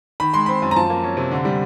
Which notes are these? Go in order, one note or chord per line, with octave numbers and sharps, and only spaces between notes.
D#3 B5
G#3 C6
C4 B5
F#2
A#5
F3 A5
A#3
C#4
C3
D3
G3